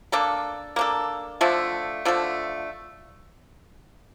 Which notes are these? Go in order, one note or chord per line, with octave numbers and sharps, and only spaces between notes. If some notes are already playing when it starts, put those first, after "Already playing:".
A#3 D4 A4
A#3 D4 A4
D3 F3 A3
D3 F3 A3